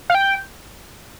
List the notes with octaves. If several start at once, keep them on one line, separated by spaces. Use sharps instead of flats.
F5
G5